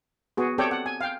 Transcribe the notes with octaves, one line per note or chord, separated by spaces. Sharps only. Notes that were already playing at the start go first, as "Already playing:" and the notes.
B3 F#4 G#4
C4 G4 A4 C#5 D5 G5
F#5
G#5
F5 G5